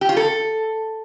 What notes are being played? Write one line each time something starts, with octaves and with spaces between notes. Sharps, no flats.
G4
F4
A4